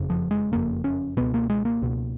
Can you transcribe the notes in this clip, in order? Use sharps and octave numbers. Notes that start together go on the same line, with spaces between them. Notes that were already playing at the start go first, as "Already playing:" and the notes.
Already playing: F#1 F2 C#3
F3
G#3
F#1 F2 C#3 A#3
C#4
C#2 B2 B3
A#3
G#3
A#3
C#2 B2